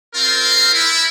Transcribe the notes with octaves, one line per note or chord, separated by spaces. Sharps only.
C4 F4 A#4
E4